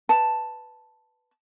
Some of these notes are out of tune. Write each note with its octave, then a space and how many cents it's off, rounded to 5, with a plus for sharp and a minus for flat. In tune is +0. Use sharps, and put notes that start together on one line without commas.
B4 +0 A5 +0